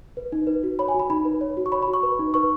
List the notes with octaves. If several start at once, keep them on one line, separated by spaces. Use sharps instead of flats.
B4
D#4
B4
F#4
C#5 B5
G#5
F#4
B5
D#4 B5
B4
C#5
F#4
C#6
C#5 B5
B5
F#4
C#6
B4
D#4
B4 C#6